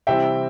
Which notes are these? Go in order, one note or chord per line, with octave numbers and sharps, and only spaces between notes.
C3 E3 G3 C4 E5 G5